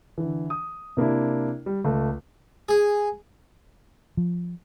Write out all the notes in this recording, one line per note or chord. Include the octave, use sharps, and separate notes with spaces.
D3 E3
D#6
C3 A#3 D4 E4
G3
C#2 A3
G#4
F3